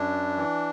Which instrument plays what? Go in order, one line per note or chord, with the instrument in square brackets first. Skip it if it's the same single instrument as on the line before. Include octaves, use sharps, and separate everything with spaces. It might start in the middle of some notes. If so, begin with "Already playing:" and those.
Already playing: [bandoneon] F#2 D4
E3